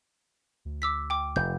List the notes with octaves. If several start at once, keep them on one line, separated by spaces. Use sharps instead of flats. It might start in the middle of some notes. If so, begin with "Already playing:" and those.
D2
D6 E6 B6
G5 D6
F1 G6